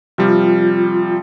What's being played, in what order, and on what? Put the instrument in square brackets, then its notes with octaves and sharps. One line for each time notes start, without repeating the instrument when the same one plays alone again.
[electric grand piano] C3 F3 G3 [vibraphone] F4